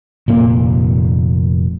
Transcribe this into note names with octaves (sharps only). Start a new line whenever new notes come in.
F1 A#2 A#3